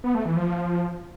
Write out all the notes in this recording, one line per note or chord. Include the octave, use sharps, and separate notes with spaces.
B3
A3
E3
F3